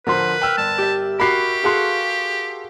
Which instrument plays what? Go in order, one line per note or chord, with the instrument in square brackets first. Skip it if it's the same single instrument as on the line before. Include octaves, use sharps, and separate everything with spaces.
[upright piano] D3 F3 C6 [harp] A#4 [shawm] B4
[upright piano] G5 E6 F6
[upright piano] G1 [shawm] A5
[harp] G4 E5
[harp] F#4 A#4 [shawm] G4 [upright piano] B5 D6 C7
[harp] F#4 G#4 F5 [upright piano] A4 C6